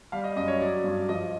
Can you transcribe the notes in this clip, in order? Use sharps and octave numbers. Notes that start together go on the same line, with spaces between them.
G3 F5
D#5
F#2 D#5
C#5
F#3 D5
G2
F3 D#5